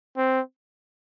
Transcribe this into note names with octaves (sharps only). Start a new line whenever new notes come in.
C4